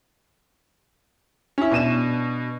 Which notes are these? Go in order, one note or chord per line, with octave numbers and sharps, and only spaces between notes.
C#4 E4
B2 D4 D#7 E7